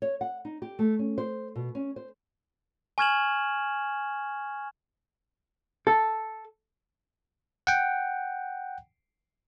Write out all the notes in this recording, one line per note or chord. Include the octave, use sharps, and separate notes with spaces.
C#5
F#5
D#4
G4
A3
C#4
C5
B2
C#4
C5
G#5 C#6 F6 G#6 E7 F#7
A4
F#5 G5